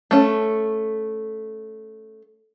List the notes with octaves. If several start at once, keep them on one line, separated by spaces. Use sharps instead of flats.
A3 C#4